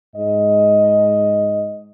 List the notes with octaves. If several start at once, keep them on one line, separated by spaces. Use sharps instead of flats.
G#2 D#5